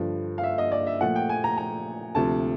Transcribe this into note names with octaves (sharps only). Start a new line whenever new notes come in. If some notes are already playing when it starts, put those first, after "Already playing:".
Already playing: G2 D3 F3
F5
E5
D#5
D5
E5
A#2 F3 A3 F#5
G5
G#5
A#5
A#5
D2 C3 F3 A5